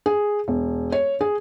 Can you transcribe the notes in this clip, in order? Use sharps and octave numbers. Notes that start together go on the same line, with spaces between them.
G#4
E1
C#5
G#4